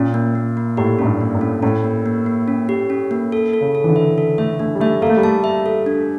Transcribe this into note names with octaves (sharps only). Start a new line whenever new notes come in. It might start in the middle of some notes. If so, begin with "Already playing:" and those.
Already playing: A#2 C#4
A#3
A#3
A#3
A2 G4
A2 C#4
G2
A#3
A2
C#4
A2 C#4
A#3
A#3
A#3
C#4
G4
C#4
A#3
A4
A4
C#3
A4
E3
D3
E5
A4
A3 E5
A3 D4
G3
A3 E5
A#3 A4
A3
G3
A3 A5
E5
A4
D4